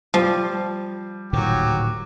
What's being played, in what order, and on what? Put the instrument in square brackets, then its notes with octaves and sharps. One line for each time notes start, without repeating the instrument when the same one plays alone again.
[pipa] F3 [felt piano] G3
[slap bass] D1 A#2 D#3 [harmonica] F#3 G4